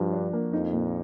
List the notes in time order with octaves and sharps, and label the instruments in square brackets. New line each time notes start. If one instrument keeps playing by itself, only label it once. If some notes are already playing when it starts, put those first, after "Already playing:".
Already playing: [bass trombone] G2 [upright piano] F3 F#4
[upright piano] D4
A#3
[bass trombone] F2 [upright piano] D#4
[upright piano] A#2